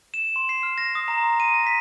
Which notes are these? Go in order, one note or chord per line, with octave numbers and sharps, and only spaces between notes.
E7
C6
C7
F6
A#6
D#6
A#5
C6
D#7
A#6
B6